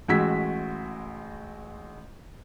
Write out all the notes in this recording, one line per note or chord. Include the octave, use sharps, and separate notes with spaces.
A1 G#3 F#4 E6 G#6 B6